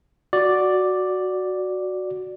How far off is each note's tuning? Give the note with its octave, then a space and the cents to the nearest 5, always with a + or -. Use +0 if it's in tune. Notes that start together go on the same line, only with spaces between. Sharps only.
F#4 -5 D5 +0